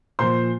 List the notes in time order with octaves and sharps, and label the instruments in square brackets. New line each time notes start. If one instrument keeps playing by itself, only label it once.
[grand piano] A#2 F3 C5 C6